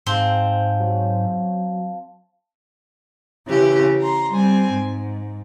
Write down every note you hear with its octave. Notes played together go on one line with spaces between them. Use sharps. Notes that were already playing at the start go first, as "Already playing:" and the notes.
G#2 C4 F5 A5
F#3
C#3 E3 G4
A#5 C6
G3 C4 G#5
G#2